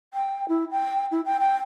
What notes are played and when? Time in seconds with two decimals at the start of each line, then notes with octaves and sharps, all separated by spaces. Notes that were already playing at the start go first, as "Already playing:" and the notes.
0.14 G5
0.49 E4
0.71 G5
1.11 E4
1.25 G5
1.40 G5